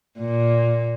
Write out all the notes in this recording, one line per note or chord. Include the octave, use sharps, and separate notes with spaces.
A#2